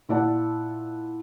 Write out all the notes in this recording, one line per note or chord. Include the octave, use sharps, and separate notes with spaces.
A#2 E4 F4 D5 F#5 A5